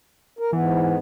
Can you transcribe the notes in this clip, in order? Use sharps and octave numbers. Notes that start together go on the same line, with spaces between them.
A#4
G#2 E3 B3